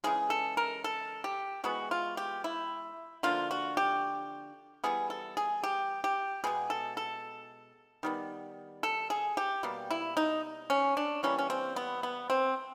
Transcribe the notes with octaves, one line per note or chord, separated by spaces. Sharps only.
C#3 E3 G#3 G#4
A4
A#4
A4
G4
E3 G#3 B3 F#4
F4
G4
E4
D3 F3 A#3 F4
F#4
G4
E3 G3 B3 G#4
A4
G#4
G4
G4
B2 G#3 B3 G#4
A4
A4
D#3 G3 B3
A4
G#4
G4
B2 G3 A#3
E4
D#4
C#4
D4
E3 G3 A#3 C#4
C#4
C4
B3
B3
C4